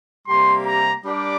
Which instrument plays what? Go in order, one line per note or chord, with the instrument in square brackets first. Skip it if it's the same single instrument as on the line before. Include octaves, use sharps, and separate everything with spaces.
[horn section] C3 G3 A#3 G4 [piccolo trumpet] C6
[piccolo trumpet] A#5
[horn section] G3 D4 G4 A#4 D5 [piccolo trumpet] D6